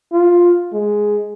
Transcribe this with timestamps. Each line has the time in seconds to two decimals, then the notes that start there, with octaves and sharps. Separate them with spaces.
0.12 F4
0.73 G#3